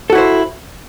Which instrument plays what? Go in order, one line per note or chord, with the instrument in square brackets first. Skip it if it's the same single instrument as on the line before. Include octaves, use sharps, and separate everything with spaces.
[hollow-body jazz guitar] A4
F#4
E4
C5